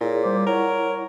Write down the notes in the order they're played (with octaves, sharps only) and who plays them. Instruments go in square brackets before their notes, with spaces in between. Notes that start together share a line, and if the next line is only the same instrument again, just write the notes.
[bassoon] A#2 [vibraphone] E4 G#4 C#5
[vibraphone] G3 D6 [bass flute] C5
[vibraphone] E4 F#5 C#6 [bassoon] A#4 [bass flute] C#5